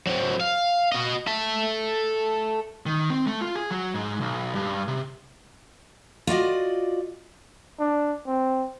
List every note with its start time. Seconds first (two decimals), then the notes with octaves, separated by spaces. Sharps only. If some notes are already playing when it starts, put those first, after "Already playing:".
0.07 F#3 C4
0.41 F5
0.92 F#4 D#5
1.28 A4 E5
2.86 D#3
3.10 C4
3.27 A3
3.41 F4
3.55 G#4
3.70 F#3
3.94 G#2
4.21 B1
4.55 G2
4.88 C3
6.27 F4 F#4 D5 D#5
7.79 D4
8.27 C4